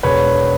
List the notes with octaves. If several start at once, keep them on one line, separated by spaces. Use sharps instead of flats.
E1 B4 C#5